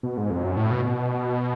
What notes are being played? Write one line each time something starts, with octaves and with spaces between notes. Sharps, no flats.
B2
G#2
F2
F#2
A2
B2
B2